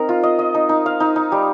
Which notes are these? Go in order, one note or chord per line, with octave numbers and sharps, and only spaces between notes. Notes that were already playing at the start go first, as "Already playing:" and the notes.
Already playing: C4 D#4 A#4
F4
D#5
D#5
D#4
D#4
F5
D#4
D#4
G3